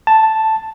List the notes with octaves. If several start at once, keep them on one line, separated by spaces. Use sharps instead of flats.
A5